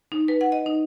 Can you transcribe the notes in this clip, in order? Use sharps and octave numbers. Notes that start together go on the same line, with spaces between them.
D#4
B4
F#5
D#5
D#4